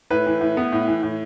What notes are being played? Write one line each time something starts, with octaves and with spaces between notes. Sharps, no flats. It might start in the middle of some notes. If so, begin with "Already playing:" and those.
A2 B4
E3
A2
B3
A2
E3
A2